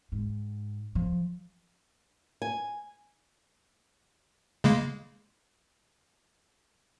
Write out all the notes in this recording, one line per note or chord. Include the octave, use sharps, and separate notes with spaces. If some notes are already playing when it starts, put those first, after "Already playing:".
G#2
F3
G#5
C#3 G#3 A#3